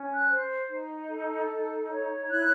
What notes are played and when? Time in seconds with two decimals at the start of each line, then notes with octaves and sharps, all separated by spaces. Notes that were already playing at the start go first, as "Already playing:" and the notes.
Already playing: C#4
0.15 F#6
0.28 C5
0.69 D#4
1.08 A4
1.48 D#4
1.89 C#5
2.29 E4 F#6